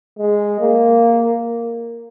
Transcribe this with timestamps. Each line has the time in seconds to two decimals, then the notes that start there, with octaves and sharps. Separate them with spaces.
0.19 G#3
0.60 A#3